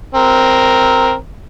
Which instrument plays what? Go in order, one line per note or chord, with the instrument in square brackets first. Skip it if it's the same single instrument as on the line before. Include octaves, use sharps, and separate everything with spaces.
[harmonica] C4 A#4